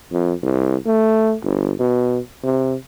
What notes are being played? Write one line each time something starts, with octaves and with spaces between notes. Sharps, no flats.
F2
C2
A3
G1
B2
C3